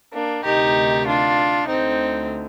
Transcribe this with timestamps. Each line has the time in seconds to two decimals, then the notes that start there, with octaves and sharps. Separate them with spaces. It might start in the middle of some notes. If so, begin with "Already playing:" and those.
0.14 A#3 D4
0.44 D2 C3 D#3 D#4 G4
1.07 D4 F4
1.68 D2 D3 C4 D#4